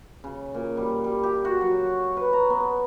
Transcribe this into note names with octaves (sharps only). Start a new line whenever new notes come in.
C#3
A#2
G3
G3
G4
F#4
F#3
B4
A#5
B3